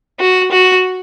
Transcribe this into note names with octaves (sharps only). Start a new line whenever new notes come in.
F#4
F#4